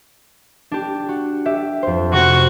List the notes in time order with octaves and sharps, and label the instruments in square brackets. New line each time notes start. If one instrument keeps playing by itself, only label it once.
[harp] D4 G4
F#4
G4 E5
F2 C5
[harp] C3 C4 [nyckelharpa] F#4 C#6